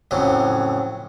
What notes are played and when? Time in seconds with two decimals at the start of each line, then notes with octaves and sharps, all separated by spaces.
0.11 F2 A2 C#3 F#3